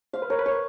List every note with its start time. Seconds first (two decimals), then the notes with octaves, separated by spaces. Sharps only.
0.13 C5 F5
0.22 B4
0.30 A#4 C#5
0.39 B4
0.46 C#5